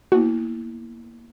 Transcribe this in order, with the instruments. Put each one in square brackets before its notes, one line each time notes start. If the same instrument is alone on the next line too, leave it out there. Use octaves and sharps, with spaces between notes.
[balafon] A#3 B3 E4 [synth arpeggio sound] F#4